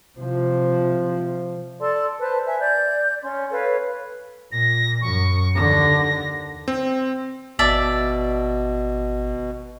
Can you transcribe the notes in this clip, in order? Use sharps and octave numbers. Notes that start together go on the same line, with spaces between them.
C3 F3
A4 D5 A5 C6
B4 C5 A5
E5 G#5
D5 G6
C#4 C6
A4 B4 C#5 F5
A#2 A#6
F#2 C#6
D#2 D3 A#6
C4
G#1 B2 D5 E5 A5